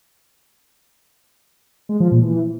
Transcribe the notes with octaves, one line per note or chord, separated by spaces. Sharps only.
G#3
F3
A#2
E3